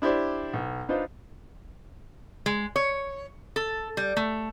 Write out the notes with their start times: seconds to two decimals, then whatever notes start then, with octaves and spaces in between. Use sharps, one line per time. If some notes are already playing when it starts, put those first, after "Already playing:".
0.02 D4 E4 G4 C5 D5
0.53 B1
0.89 D4 D#4 F4 B4 C5
2.46 G#3
2.76 C#5
3.56 A4
3.97 G3
4.17 A3